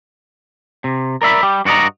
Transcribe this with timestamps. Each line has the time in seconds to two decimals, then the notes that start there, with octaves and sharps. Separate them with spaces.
0.84 C3
1.22 A#4 D5 E5 B5
1.43 G3 G4
1.65 G2 F#4 D5 D#5 A#5